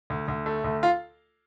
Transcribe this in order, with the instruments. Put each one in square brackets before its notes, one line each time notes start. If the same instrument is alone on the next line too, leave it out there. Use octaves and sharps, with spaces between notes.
[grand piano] D2
D2
A3
D2
F4 F5